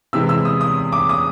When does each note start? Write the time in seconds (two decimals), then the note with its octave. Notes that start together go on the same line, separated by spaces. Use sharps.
0.13 C3 E3 G#3 E6
0.29 E6
0.45 D#6
0.61 D#6
0.92 D6
1.09 D#6